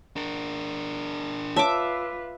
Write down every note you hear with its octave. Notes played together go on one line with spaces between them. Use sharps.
D4 A#4
F4 B4 C#5 E5 A5 D6